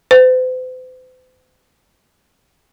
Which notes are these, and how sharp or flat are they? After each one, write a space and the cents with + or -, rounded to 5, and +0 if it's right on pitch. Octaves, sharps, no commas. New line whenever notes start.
C5 -45